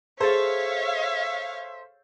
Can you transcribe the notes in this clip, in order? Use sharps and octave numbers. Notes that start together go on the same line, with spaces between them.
G#4 A4 C5 C#5 E5 F5 A6